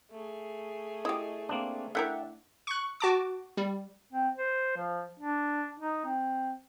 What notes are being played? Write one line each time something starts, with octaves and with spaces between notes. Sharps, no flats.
A3 G#4
E4 G4 D#5
A#3 C4 D4
A3 D4 E4 A#4 E5 F#5 G5
C#6 F#6
F#4 A5 D6
G3
C4
C5
F3
D4
D#4
C4